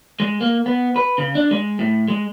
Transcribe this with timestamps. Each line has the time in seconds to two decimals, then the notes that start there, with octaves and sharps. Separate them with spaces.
0.20 G#3
0.41 A#3
0.66 B3
0.96 B4
1.18 C#3
1.35 D4
1.51 G#3
1.79 A2
2.08 G#3